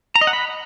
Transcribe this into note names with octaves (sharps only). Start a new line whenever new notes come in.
A#5
D#5
F#5
B5